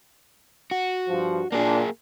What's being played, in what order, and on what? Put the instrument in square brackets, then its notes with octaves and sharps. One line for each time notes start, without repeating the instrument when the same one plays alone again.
[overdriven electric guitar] F#4
[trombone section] G2 F3
[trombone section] A#2 D4 [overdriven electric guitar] A#3 G#4